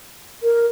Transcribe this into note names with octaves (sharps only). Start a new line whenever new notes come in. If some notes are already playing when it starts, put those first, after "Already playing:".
A#4